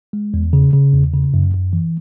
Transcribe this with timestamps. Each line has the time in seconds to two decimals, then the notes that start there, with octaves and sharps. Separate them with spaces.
0.13 G#3
0.34 E2
0.53 C#3
0.73 C#3
0.93 E2
1.13 C#3
1.34 F#2
1.54 F#2
1.73 E3